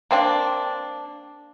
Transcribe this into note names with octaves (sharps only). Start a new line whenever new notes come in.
A#3 C4 D4